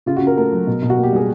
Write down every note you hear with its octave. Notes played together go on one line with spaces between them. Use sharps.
C#3 F4
F#4
C#4
A#4
A3 A#4
F#3
B2
B2
F#4
A#3
G4
G3 G#4